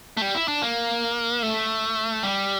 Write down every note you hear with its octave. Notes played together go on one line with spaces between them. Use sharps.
A3
G3
E4
D4
A#3
A3
G3